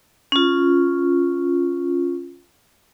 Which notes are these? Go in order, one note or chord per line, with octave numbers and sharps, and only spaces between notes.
C#4 F4